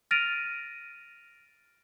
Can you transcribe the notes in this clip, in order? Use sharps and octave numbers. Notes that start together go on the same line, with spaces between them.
F6 A6 A#6 D7 D#7 F7